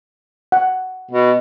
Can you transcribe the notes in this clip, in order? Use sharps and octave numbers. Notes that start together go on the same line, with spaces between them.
F#5
B2